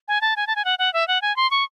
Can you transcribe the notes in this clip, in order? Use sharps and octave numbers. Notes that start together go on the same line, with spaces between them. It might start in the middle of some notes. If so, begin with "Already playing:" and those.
G#5
A5
G#5
A5
G#5
F#5
F#5
E5
F#5
G#5
C6
C#6